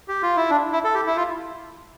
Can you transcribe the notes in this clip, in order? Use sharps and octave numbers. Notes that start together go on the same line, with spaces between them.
G4
F4
E4
D4
E4
A4
G4
E4
F4